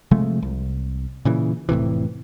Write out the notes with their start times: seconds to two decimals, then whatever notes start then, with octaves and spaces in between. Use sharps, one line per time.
0.11 C3 F3 G#3 A3
0.42 C2
1.25 A#2 C#3 E3
1.69 F1 A2 C3 E3